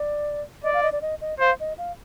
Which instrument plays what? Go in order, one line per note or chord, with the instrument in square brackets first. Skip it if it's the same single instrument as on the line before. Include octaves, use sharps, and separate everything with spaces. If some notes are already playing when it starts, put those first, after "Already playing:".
Already playing: [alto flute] D5
[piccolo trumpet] D5 [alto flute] D#5
[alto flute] F5
D#5
D5
D#5
D#5
[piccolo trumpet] C5 [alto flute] F5
[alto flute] D#5
F5